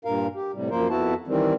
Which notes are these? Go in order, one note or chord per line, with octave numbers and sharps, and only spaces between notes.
G2 A#2 A#4 F5
G4
A2 C3 G3
F#2 F3 A#3 A#4 C5
F2 B3 E4 F#4 A5
D#3 E3 G3 C4